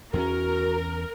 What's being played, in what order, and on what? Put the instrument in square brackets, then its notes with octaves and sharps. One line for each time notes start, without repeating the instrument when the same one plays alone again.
[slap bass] E2 B3 C#4 [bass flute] F#4 [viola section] A#4